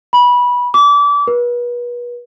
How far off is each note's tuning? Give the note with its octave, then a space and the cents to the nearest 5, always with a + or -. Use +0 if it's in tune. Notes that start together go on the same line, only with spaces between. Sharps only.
B5 -15
D6 -30
B4 -35